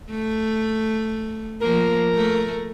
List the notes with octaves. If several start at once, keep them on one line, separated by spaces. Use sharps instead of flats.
A3
F3 A#3 A#4
A3